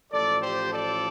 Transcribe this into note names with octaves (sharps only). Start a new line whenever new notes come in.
A1 A2 F3 A4 D5
G4 C5
A4 D5